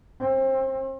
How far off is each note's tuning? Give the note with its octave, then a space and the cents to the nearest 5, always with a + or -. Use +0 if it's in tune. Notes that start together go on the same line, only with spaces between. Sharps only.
C4 +30